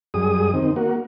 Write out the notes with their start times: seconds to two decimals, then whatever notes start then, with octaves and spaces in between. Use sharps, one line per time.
0.14 F#2 G3 G#4 D#6
0.54 D#3 C4
0.76 A#3 F#4